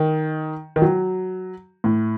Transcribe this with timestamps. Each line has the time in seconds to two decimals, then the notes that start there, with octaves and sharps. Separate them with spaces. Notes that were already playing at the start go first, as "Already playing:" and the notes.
Already playing: D#3
0.76 D#3
0.82 F#3
1.84 A2